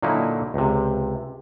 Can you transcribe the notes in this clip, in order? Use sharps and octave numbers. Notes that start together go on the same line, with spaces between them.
A#2 D3 F#3 A#3 D#4 E4
C#2 C3